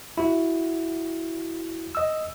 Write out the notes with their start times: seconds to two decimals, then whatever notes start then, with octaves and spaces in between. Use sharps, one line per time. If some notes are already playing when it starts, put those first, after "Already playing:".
0.17 E4 F#4
1.95 D#5 E6